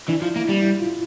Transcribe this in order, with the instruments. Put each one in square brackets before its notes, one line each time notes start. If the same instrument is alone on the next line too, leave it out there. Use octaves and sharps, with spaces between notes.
[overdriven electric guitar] E3 [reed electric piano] D4
[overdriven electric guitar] F3 [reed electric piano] E4
[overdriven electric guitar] A#3 [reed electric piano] E4
[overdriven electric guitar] G3 [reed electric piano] D4
[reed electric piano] E4
F4